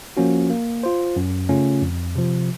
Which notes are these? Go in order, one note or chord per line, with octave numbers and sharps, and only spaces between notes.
F3 A#3 C#4 F#4
A#3
F4 C5
F#2
C#3 A3 C#4 F4
F2
C3 F3